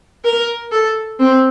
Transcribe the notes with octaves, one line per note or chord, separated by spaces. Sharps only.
A#4
A4
C4